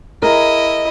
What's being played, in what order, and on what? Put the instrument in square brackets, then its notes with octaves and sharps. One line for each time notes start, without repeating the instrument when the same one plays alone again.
[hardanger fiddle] E4 D#5 [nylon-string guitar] G#4 A#4